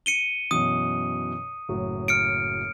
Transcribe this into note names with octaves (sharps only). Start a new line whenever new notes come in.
C#7 D#7 G7
F#2 B2 E3 D#6
F#1 A2 F#3
F6 C#7 D7